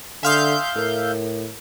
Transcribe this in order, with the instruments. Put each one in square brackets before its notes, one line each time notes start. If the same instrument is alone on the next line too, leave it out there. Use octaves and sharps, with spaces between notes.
[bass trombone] D3 [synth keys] E5 F5 G6 [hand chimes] G#5 C6 D#6
[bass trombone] A2 [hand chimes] A4 A#4